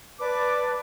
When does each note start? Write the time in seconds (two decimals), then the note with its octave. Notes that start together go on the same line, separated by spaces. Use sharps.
0.20 B4 D5 A5 D6